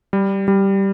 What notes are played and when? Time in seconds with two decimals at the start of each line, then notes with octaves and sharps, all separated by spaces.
0.13 G3
0.48 G3